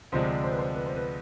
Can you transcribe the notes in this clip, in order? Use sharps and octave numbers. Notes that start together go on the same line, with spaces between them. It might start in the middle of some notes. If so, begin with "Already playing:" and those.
D2 C3 F3 G#3 D4 C5
C5
B4
C5
B4
C5
B4